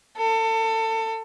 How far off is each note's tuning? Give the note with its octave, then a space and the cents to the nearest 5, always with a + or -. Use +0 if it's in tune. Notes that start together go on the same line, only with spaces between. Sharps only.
A4 +30